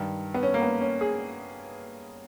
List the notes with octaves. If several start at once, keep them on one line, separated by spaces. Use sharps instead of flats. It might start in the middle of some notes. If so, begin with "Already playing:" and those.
Already playing: G2 D#3
B3
C#4
A#3
B3
C#4
G#4